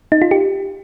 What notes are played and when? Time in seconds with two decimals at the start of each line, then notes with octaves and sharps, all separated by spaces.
0.12 D#4
0.22 F4
0.31 G4